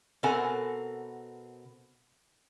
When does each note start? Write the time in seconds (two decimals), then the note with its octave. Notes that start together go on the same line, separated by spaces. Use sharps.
0.23 B2 C4 A4 A#4 F#5 G#5